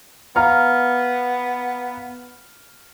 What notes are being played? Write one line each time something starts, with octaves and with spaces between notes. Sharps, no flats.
B3 F5 A#5 F6